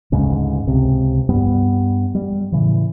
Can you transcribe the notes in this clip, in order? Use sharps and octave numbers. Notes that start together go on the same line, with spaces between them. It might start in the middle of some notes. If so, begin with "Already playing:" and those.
D2 G#2 C#3
C#2 C3
G2 G3 B3
G3
A2 C#3 E3